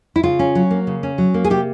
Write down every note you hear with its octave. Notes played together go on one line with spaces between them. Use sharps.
E4
C#3 F4
C#4
F#3
A#3
C#3
C#4
F#3
A#3
G#4
C3 G4